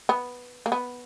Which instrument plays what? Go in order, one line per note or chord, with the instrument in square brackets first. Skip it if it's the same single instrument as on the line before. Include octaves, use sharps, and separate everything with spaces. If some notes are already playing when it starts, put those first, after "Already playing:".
[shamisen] B3
A#3
B3